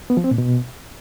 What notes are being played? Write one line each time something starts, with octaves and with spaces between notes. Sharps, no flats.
B3
F3
C4
A#2
B2